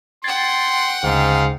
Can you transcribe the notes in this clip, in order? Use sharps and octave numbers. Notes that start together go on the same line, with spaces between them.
F#5 G5 C6 G#6 A6 C7
D2 G#2 C#3 F5